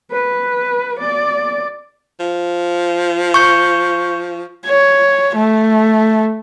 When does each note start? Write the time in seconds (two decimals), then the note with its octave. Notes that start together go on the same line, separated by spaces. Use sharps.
0.11 B4
1.00 D5
2.20 F3
3.34 C#6 G6
4.66 C#5
5.36 A3